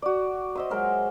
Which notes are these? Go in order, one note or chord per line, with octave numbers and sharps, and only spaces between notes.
F#4 D5
C5 D#5 E5 D#6
F#3 G#3 A#4